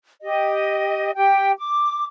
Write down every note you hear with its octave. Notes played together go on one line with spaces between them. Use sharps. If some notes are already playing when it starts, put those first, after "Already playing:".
G4 D#5
G4 G5
D6